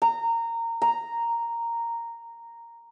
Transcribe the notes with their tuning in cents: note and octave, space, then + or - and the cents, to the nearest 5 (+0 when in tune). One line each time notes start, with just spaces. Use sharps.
A#5 -20
A#5 -5